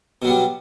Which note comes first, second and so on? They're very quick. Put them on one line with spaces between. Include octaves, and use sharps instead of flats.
B2 F#3 B3 G3